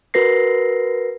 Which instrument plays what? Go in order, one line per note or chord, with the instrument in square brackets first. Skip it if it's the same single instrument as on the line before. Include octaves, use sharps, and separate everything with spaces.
[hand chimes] F#4 A#4 B4 A#6 C7